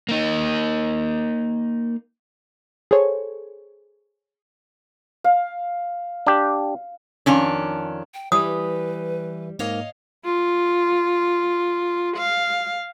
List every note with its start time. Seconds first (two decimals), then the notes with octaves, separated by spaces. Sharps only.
0.09 A#3 D#4
2.91 G#4 A4 C5 C#5
5.24 F5
6.27 D4 G4
7.26 F2 D#3 C#4 D4
8.14 G5
8.32 E3 G3 E4 B4 D#6
9.59 G#2 A#3 C#5 D#5 F5
10.25 F4
12.17 F5